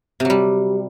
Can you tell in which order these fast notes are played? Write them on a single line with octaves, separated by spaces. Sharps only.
C3 F#3 G3